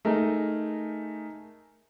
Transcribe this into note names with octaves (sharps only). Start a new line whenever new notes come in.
A3 D#4 G#4 A#4